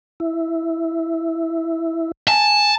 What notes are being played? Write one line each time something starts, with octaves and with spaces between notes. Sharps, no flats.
E4
G#5 A5